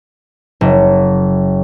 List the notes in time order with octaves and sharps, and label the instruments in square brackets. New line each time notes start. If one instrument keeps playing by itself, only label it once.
[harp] F#1